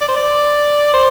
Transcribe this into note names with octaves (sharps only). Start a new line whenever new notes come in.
D5
C5
D5
C5